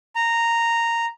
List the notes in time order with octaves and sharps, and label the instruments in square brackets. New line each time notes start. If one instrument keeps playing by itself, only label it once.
[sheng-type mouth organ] A#5